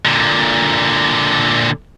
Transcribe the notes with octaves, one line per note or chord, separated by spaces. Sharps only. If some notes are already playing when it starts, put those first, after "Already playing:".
A#2 D3